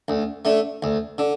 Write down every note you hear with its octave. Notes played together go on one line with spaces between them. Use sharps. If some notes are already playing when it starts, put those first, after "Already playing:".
D2
D3 A3
D2
D3